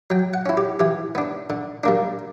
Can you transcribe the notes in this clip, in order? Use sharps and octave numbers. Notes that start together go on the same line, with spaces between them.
F#3 G5
F#5
C#4 E4
G4
E3 G4
B3 D4
D3
G3 A#3 D4